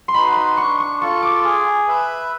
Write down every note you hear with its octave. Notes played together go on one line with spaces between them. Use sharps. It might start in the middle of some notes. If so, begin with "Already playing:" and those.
C6
D#4 F#4 B4 B5
C6
D4 C#6
C#6
F4 A4 C#6
D6
G#4
B4 E5